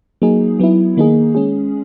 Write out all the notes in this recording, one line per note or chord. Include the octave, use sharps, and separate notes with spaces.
F#3 A#3 D#4 G#4
F#3 B3 E4
D#3 A#3 D#4 G#4
G#3 C#4 G#4